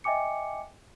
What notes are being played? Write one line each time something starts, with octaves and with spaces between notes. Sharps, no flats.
D#5 E5 G5 G#5 D6 C#7